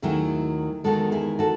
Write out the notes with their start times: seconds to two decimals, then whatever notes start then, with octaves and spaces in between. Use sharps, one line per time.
0.02 D#2 D#3 F#3 A3 E4 G#4
0.84 E2 D#3 G#3 F#4 A4
1.12 E4 G#4
1.39 F#4 A4